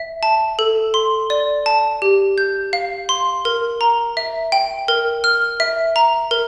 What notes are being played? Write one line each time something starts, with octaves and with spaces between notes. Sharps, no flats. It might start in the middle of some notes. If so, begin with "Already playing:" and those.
Already playing: E5
A5
A4
C6
D5
A5
G4
G6
F5
C6
A#4
A#5
E5
G5
A#4
F6
E5
A#5
A#4